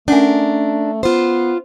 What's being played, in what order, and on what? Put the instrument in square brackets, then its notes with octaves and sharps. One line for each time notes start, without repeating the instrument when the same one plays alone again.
[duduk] A3 [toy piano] C#4 F#5 G#5 [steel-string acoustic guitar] D4 A#4
[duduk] B3 [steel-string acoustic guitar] F4 C5